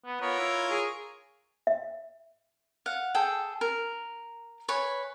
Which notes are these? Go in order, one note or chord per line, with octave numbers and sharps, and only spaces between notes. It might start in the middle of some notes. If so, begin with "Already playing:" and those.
B3
B3 F4 A#4 C#5
E4
G#4
E5
F5 F#5
G#4 A4 G5
A#4
B4 C#5 G#5